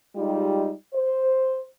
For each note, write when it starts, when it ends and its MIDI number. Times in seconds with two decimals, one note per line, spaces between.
0.16 0.72 55
0.16 0.72 56
0.16 0.72 63
0.16 0.72 65
0.16 0.72 67
0.94 1.63 72